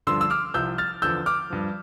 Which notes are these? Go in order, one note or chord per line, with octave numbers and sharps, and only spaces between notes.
G2 D3 F3 C6 E6
E6
D6 F6
C2 C3 F3 E6 G6
F6 A6
E2 D3 F3 E6 G6
D6 F6
G2 F3